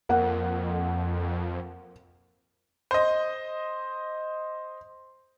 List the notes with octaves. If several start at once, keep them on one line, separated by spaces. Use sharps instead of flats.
F2 A#3 F#5
C5 D#5